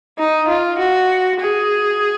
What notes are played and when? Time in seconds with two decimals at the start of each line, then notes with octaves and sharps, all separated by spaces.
0.18 D#4
0.48 F4
0.79 F#4
1.40 G#4